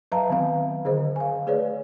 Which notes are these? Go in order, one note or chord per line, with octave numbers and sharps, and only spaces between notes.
F#3 B4 E5 F5 A5 A#5
D#3 B3 C4 F5
D3 G#4 C5 D#5
F5 G#5
A3 G#4 B4 C#5 D5